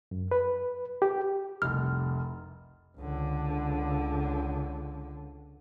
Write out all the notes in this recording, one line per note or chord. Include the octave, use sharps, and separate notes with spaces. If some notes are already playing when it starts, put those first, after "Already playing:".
F#2
B4
G4
F1 C2 F6
C#2 D3